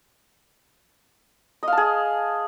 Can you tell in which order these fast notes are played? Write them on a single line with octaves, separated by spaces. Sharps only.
D#5 F5 A5 G#4